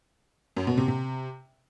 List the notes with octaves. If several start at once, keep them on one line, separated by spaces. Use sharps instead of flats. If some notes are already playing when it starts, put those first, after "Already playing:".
F#2
B2
C3
C3